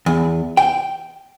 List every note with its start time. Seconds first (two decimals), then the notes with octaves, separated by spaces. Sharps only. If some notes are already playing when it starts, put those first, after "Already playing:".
0.06 E2
0.57 G5